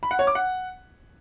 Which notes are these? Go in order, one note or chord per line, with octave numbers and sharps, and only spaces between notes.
B5
F#5
C#5
D6
F#5